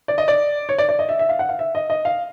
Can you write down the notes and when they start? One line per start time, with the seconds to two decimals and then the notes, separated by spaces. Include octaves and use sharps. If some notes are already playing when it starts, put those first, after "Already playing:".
0.08 D5
0.18 D#5
0.28 D5
0.69 C#5
0.78 D5
0.89 D5
0.99 D#5
1.09 E5
1.19 E5
1.29 F5
1.39 F#5
1.49 F5
1.59 E5
1.75 D#5
1.90 D#5
2.05 F5